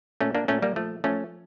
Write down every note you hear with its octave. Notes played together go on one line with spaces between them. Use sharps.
A#2 A3 C#4
A#3 D4
A#2 A3 C#4
G3 A#3
F3 A3
F3 A3 C#4